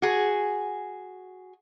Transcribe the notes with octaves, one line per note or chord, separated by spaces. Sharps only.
F#4 G#4